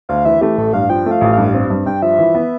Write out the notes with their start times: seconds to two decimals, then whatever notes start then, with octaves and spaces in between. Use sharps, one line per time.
0.09 D2 F5
0.25 E3 E5
0.41 A3 G4
0.58 A1 A4
0.73 G2 F5
0.90 F3 G5
1.06 A3
1.11 F5
1.21 A1
1.33 G2 F5
1.54 C4
1.70 G2
1.86 G2 G5
2.02 F3 E5
2.19 E3
2.35 B3